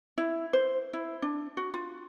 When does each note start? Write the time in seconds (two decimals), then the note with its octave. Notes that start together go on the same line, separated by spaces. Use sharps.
0.18 E4
0.53 C5
0.93 E4
1.22 D4
1.57 F#4
1.74 F4